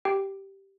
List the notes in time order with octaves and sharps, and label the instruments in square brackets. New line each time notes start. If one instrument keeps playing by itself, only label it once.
[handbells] G4 G5